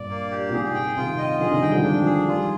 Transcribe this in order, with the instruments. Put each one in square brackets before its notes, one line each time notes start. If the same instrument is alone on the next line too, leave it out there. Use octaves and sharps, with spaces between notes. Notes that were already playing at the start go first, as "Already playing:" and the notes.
Already playing: [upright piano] G2 A#2 [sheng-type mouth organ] D5
[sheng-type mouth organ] A#3
G4
[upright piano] A#2
[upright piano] G#2 C3 [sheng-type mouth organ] G#4
[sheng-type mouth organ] G5
[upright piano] C3 D#3 [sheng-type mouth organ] F4
[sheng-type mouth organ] D#5
[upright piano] D3 F3 [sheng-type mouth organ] G#4
[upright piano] C3 D#3
[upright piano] D#3 G3 [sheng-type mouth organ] G5
[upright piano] D3 F3
[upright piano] G#3 [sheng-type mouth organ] D4
[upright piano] F3 G#3 [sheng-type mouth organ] G#4
[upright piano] D#3 G3 [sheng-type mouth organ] F4